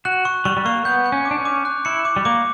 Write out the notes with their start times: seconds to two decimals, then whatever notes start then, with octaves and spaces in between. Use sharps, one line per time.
0.05 F#4 F#6
0.25 C#6
0.45 G3 C#6
0.57 G3
0.65 A#3 C#6
0.85 B3 G6
1.06 G6
1.12 C#4
1.25 D6
1.31 D4
1.38 C#4
1.45 D6
1.65 F#6
1.85 E4 C#7
2.05 D6
2.16 G3
2.25 A#3 D6